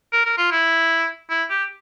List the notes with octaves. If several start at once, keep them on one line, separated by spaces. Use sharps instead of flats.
A#4
A#4
F4
E4
E4
G4